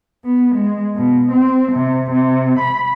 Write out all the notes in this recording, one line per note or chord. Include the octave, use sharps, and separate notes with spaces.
B3
G#3
B2
C4
C3
C3
B5